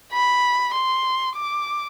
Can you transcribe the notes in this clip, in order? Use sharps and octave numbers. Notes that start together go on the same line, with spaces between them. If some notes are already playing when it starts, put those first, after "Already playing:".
B5
C6
D6